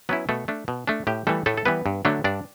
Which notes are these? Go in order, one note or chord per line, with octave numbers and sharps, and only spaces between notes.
F#3 B3 C#4 E4 B4
B2 A3 A4
A3 D4
B2
A3 D4
A2 G4
E3 G3 A3 A4
A2 A3 A4
A4
E3 G3 B3 B4
G2
D3 F#3 A3 D4
G2 D4 D5